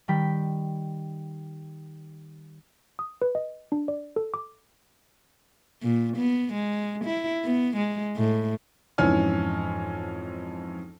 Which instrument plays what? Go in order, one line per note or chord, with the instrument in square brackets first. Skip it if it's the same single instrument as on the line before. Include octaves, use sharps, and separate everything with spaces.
[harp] D#3 G3 G5 B5 B6
[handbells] D#6
B4
D#5
D4
D5
A4
D6
[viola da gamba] A#2
B3
G#3
E4
B3
G#3
A2
[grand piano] F2 G#2 E3 C#4 G#5 F6